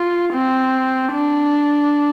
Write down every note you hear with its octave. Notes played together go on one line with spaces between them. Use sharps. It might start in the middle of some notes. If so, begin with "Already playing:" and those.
Already playing: F4
C4
D4